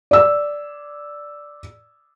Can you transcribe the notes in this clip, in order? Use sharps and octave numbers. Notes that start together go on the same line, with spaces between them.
D5 E6